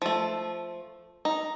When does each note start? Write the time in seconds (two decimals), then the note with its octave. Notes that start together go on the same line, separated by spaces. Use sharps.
0.02 F3 A3
1.25 D#4